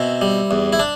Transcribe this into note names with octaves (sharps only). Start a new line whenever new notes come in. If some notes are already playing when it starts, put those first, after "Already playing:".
Already playing: B2 C4 E4
G3
E2
E4
D4